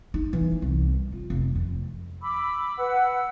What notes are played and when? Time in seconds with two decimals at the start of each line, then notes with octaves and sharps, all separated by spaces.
0.14 D#4
0.33 E3
0.62 C2
1.12 F4
1.30 F1
1.55 F2
2.22 B5 D6 E6
2.77 B4 F#5 E6